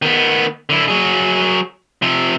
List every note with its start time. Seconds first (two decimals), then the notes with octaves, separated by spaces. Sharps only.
0.02 D#3 B3
0.70 D3 E4
0.88 F#3 G#4
2.02 C3 F3